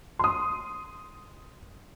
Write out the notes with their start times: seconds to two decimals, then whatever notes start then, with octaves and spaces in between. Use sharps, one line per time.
0.19 C6 D#6